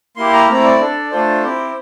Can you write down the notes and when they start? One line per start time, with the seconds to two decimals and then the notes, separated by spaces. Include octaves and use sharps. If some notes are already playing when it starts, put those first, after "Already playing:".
0.16 A#3 E4 G4 C6
0.33 A#5
0.48 A3 C4 E4 A#5
0.64 D5
0.80 D4 A4
1.11 A3 D4 F4 A4 C5
1.43 C4 E4 G4